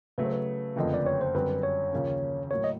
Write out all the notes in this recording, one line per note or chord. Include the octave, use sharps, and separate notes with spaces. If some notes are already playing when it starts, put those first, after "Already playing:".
C#3 F#3 A3 B4
C5
B4
F#1 F2 D3 F3 A3 D#5
D5
C#5
C5
F#2 D3 G3 C4 B4
C#5
D#2 C#3 F3 A#3 C#4
A2 F#3 A#3 C#5
D#5